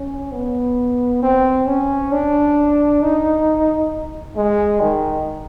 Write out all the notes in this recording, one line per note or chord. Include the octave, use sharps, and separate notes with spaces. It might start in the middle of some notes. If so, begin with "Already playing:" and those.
Already playing: C#4
B3
C4
C#4
D4
D#4
G#3
D#3